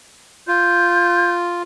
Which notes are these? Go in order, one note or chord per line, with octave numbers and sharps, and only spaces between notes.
F4 G6